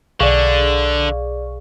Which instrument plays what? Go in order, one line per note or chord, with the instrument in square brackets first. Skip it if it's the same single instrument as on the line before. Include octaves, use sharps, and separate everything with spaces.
[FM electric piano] B1 G#4 F5 [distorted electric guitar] D3 [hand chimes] D5 C#6